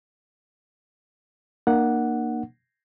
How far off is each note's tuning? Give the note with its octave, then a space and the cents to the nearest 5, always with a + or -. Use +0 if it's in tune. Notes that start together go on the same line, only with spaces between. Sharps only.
A#3 +5 D4 +45 F#5 +0